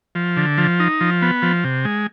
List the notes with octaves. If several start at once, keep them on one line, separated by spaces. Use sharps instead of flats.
F3
D3
F3
D#4
F3
B3
F3
C3
G#3